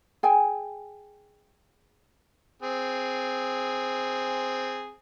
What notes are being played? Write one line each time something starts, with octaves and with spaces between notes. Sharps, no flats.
G#4 G5 G#5
C4 G#4